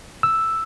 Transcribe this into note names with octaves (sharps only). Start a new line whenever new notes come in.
E6